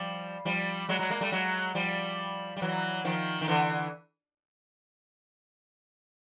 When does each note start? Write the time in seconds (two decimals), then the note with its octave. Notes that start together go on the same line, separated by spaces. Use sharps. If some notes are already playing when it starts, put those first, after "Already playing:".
Already playing: F3 G3
0.45 F3 G3
0.89 F#3 G#3
0.99 F#3 G#3
1.10 G#3 A#3
1.21 G3 A3
1.32 F#3 G#3
1.75 F3 G3
2.57 G3
2.62 E3 F#3
3.04 D#3 F3
3.41 D#3
3.48 D3 E3